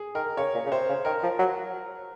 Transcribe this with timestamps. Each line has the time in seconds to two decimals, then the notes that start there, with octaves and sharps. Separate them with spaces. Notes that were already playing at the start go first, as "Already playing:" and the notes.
Already playing: G#4
0.15 D#3 A#4
0.37 C#3 C#5
0.54 A#2
0.66 C#3
0.71 C3 C5
0.89 C#3
1.05 D#3 A#4
1.23 F3
1.39 F#3